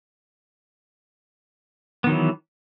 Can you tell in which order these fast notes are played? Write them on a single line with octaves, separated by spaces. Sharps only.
B3 D#3 F#3 E3